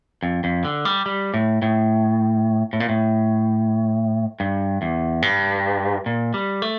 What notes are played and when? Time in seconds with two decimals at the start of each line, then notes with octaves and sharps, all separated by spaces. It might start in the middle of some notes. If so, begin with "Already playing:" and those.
0.23 F2
0.44 F2
0.65 D3
0.85 G3
1.06 G3
1.34 A2
1.62 A2
2.73 A2
2.80 A#2
2.89 A2
4.40 G2
4.82 E2
5.22 G2
6.06 A#2
6.34 G3
6.62 A3